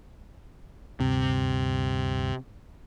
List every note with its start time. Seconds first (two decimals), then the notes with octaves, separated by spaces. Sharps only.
1.00 D2 G2 C3